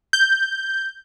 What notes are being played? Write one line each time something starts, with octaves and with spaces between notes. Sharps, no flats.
G6